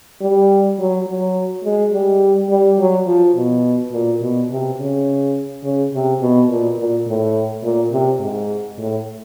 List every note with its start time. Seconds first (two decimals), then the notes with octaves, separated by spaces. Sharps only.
0.21 G3
0.79 F#3
1.07 F#3
1.65 G#3
1.93 G3
2.49 G3
2.79 F#3
3.07 F3
3.36 B2
3.92 A#2
4.21 B2
4.50 C3
4.78 C#3
5.64 C#3
5.93 C3
6.21 B2
6.49 A#2
6.78 A#2
7.07 A2
7.63 A#2
7.92 C3
8.20 G#2
8.78 A2